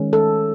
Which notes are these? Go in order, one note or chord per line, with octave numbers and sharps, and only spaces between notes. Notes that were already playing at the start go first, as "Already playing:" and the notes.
Already playing: D#3 G#3 C#4
A4